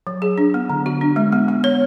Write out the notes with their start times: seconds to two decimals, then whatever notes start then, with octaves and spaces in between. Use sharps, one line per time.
0.07 F#3
0.22 G#4
0.38 D4
0.54 B3
0.70 D3
0.86 F#4
1.01 D4
1.16 G#3
1.32 B3
1.48 B3
1.64 C#5